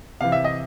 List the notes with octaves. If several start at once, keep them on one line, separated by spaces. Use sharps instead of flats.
C3 E3 F5
E5
D#5